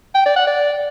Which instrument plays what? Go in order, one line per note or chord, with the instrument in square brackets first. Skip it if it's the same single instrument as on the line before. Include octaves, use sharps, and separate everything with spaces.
[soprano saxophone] G5
D5
F#5
D5